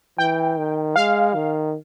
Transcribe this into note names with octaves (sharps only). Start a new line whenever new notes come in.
E3 G5
D#3
G#3 F5
D#3